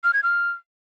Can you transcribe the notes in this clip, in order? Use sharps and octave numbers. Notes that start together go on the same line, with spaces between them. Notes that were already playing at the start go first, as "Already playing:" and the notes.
F6
G#6
F6